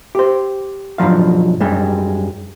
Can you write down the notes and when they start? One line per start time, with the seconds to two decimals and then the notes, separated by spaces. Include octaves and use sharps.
0.15 G4 C5
0.98 B1 G2 F3 F#3 F5
1.60 F#2 G3 G#3